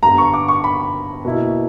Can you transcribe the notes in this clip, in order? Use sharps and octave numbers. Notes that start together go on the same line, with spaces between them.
G2 D3 G3 B3 A#5
C#6
D6
C#6
B5
B2 A#3 E4